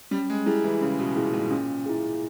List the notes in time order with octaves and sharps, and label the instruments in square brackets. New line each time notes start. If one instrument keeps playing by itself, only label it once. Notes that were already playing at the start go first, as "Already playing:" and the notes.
[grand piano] G3 [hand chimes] C#4
[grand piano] G#3
[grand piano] G3 [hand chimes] E4 G#4
[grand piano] E3
[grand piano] C#3 [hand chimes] C#4
[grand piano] B2
[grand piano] A#2 [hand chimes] E4 G#4
[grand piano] G#2
[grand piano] A#2 [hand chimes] C#4
[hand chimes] E4 G#4